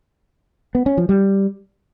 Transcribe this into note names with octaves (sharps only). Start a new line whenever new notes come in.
B3
C#4
F3
G3